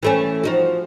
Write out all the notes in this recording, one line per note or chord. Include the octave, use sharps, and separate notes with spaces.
E3 A3 C#4
F3 D#4 F#4